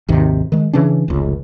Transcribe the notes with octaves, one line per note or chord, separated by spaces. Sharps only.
G#1 D#2 C3 D#3
D#3 G#3
C#3 E3 C#4 D4
F1 C#2